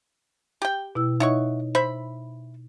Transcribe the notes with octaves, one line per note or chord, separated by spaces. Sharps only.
G4 G5
B2 E4 E6
D#4 E4 C#5 D#5 F#5 C#6
C5 E5 B5